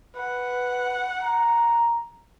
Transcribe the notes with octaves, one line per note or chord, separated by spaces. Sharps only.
B4 F#5
A#5